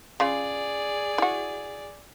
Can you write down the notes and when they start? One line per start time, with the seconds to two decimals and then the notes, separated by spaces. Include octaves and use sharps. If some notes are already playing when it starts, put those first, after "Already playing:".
0.20 C#3 F4 G#4 D5
1.18 E4 F#4